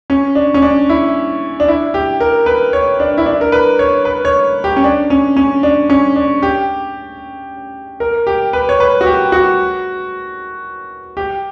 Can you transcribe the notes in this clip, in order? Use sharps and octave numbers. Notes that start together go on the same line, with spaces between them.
C#4
D4
C#4
D4
E4
D4
E4
G4
A#4
B4
C#5
D4
E4
D4
A#4
B4
C#5
B4
C#5
G4
C#4
D4
C#4
C#4
D4
C#4
D4
G4
A#4
G4
B4
C#5
B4
F#4
G4
F#4
G4